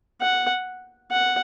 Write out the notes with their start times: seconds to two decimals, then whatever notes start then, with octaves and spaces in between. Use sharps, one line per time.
0.21 F#5
1.11 F#5